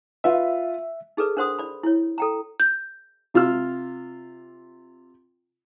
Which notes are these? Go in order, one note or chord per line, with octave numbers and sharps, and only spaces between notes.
F4 B4 E5
D#4 G#4 A4 B4 D5
D4 A#4 C5 F#5 C6 D#6
D5 B5
E4 C#5
A4 G5 A#5
G6
C3 F4 E6 F6